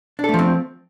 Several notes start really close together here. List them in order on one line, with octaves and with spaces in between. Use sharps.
D4 A4 A3 F3 C4